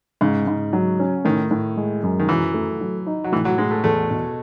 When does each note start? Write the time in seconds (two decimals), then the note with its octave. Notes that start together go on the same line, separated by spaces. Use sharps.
0.21 G#2 C#3
0.47 G#2
0.73 F#3
0.99 C#4
1.25 A2 D#3
1.51 A2
1.77 G#3
2.03 F#2
2.19 D#3
2.28 E3 F#3
2.54 A3
2.81 F#3
3.07 D#4
3.24 F#3
3.32 A2 E3
3.45 F#3
3.58 A2 G#3
3.71 A3
3.84 E2 A3
4.10 B2